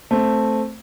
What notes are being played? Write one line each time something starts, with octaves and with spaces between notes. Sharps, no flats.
A3 C4